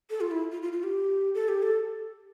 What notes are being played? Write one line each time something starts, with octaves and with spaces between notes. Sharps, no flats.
A4
F4
E4
F4
F4
F4
G4
A4
G4
A4